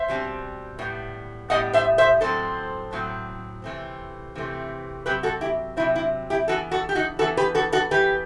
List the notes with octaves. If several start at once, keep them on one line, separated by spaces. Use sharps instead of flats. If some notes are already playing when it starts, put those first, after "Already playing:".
Already playing: C5 E5
B2 G3 C4
A2 G3 B3
A2 G3 B3 D#5 F#5
C5 E5
C5 E5
A2 F#3 C4 A4 C5
A2 F#3 C4
C3 E3 A3 C4
C3 E3 A3 C4
C3 F#3 C4 G4 B4
F#4 A4
E4 G4
C3 F#3 C4 E4
E4
E4 G4
E3 B3 F#4 A4
F#4 A4
G4
D#4 F#4
E3 B3 F#4 A4
G4 B4
F#4 A4
F#4 A4
E3 B3 G4 B4